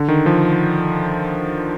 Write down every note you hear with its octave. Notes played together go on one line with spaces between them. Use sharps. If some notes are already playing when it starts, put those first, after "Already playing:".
Already playing: D3
D#3
F3